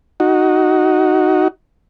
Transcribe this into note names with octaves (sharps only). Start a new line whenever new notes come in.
D#4 F#4